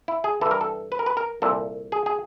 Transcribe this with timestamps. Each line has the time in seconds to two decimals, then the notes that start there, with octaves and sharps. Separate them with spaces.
0.08 E4
0.24 G#4
0.41 G2 E3 A4
0.51 A#4
0.61 A4
0.92 B4
0.99 A#4
1.06 B4
1.17 A#4
1.42 C2 A#2 A4
1.92 G#4
2.06 G#4